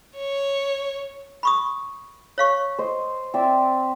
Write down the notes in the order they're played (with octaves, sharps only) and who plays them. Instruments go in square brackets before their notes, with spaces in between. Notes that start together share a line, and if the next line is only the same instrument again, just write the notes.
[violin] C#5
[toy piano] B5 C#6 D#6
C#5 F5 C#6
[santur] C5 D#5
C4 D5 E5